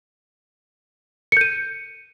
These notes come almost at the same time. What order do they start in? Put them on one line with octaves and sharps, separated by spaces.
C#7 G6 D#7